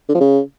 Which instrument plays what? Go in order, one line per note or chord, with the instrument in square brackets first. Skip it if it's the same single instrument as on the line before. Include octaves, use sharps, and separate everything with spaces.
[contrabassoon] D3
F3
C#3